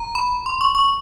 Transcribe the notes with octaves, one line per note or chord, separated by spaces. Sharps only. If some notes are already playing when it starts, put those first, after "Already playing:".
Already playing: A#5
B5
C6
C#6
C#6